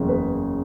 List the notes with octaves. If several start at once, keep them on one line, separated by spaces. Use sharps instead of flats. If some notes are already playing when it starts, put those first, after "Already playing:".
Already playing: F#1 E2 C#3
B4